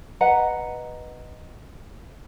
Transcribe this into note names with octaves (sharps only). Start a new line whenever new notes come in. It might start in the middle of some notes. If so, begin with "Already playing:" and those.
B4 D#5 F#5 A#5